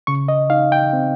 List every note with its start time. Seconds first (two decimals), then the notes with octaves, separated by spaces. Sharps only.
0.07 C#3 C#6
0.28 D#5
0.50 D#4 F5
0.72 G5
0.93 C4